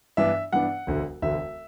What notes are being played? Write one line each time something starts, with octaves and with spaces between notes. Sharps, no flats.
G2 E3 B3 D4 E5
G2 E3 B3 D4 F#5
E1 D2 D3
E1 D2 D3 E5